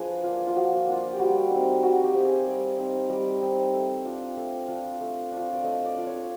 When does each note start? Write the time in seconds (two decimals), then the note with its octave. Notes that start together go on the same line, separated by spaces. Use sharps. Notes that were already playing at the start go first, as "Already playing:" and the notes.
Already playing: F3 D4 G#4 B4
0.24 A#3 D4 F4
0.47 F4
0.56 F3 F#4
0.77 F4
0.87 A#3 D4 F4
1.13 G4
1.19 G3 F#4
1.51 C4 D#4
1.83 G3 F#4
2.04 G4
2.14 C4 D#4 G4
2.25 G#4
2.46 G3 D5
2.78 C4 D#4
3.10 G3 D#5
3.42 C4 D#4
3.73 A3
4.05 D4 F4
4.37 A3
4.68 D4 F4
5.01 A3
5.32 D4 F4
5.53 D5
5.64 A3 D#5
5.85 D5
5.96 D4 F4
6.06 C#5